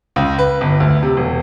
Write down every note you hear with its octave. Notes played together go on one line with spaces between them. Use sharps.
C#2
B4
G1
D2
C3
E1